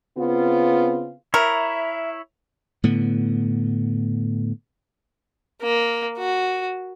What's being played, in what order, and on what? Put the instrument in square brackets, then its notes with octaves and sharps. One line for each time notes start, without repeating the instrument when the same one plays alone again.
[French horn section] C#3 B3 C4 F4
[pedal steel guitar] E4 C#5 [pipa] A#4 [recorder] E5
[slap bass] A2 D3 B3
[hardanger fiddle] A#3
F#4